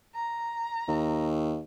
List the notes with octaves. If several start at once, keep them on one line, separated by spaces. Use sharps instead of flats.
A#5
D#2